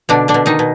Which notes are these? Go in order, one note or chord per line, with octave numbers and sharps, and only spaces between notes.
B2 D3 D4
D3 D4
B2
D#3 D#4
B2